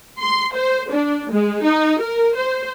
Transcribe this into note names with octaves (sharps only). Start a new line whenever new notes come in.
C6
C5
D4
G#3
D#4
A#4
C5